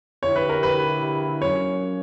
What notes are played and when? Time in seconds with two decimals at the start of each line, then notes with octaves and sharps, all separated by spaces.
0.23 D3 A#3 E4 G4 C#5
0.36 B4
0.49 A#4
0.63 B4
1.42 F#3 A#3 C#4 C#5